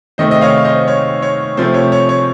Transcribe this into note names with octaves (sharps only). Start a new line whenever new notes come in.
C3 D#3 A3 C5 D#5
D#5
C#5 F5
F5
C5 D#5
C#5
C#5
C3 F3 A3 C5
C#5
C#5
C#5